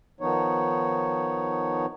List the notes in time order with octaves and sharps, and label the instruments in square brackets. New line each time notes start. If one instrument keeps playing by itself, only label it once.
[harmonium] D#3 F3 B3 D#4 C#5